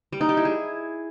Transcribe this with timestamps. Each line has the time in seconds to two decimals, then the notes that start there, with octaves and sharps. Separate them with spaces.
0.12 G3
0.21 D#4
0.29 G4
0.37 E4
0.45 G#4